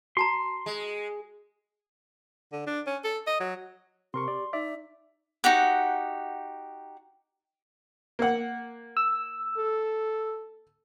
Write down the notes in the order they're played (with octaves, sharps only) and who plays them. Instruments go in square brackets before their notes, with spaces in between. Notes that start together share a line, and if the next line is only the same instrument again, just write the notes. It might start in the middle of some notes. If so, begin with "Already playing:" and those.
[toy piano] F#4 A5 A#5 [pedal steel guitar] C6
[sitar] G#3
[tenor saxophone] D3
D4
C#4
A4
D#5
F#3
[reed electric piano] C3 A#4 C#6 [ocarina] G4 [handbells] C6
[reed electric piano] D5
[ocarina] D#4 [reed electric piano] D5 [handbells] E5
[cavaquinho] D#4 F#4 G4 F#5
[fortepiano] A#3 F#5
[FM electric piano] E6
[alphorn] A4